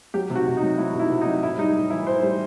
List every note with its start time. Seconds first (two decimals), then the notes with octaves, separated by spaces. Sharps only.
0.14 F#3 G4
0.30 C3
0.35 F#4
0.47 C3
0.57 D#4
0.63 F#3
0.78 F#3 E4
0.94 C3
1.00 E4
1.10 C3
1.21 D#4
1.26 F#3
1.43 A2 E4
1.58 G3 D#4
1.75 A2
1.90 E3 E4
2.07 A2 C5
2.23 G3